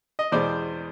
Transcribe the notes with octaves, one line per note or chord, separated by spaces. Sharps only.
D#5
E2 B2 G#3 C5 D5